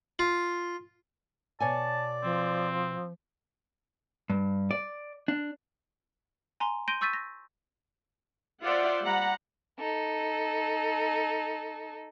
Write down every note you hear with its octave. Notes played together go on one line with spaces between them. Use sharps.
F4
B2 C#5 D5 G#5 A5
F3 C4
G2
D5
D4
G#5 A#5 C6
C6 G6 A#6 D7 D#7
C#6 E6 G6 A6 B6 D#7
A#6
F4 C5 D5 E5 F#5
G3 F#5 A#5 B5
D#4 A4